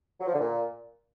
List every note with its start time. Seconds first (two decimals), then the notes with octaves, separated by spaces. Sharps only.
0.20 F#3
0.27 F3
0.33 D3
0.40 A#2